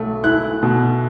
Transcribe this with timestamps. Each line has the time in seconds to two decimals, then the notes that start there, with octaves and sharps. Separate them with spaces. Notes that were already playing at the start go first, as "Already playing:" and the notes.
Already playing: B1 A3
0.24 E4 F#6
0.63 B2